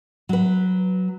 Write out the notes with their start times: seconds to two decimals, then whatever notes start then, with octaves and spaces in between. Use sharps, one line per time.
0.29 F#3 B4